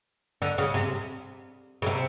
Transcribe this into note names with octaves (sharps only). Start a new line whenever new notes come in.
D3
C#3
C3
C#3
C3